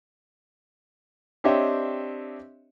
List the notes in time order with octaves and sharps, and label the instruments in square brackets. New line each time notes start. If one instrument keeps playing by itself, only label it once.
[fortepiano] C4 D4 G4 C#5 D#5 E5